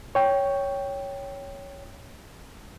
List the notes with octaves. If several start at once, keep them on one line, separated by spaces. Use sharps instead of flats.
C#5 G5